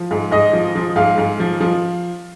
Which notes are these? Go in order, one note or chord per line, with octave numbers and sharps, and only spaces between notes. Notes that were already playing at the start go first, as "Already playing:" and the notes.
Already playing: F3
G#2
G#2 D#5
F3
F3
G#2 F5
G#2
F3
F3